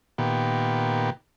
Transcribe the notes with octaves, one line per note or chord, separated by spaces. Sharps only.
A#2 D#3 B3 G4